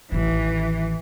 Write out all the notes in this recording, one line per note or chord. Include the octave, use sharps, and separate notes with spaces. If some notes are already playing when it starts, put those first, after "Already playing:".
A1 D#3 E3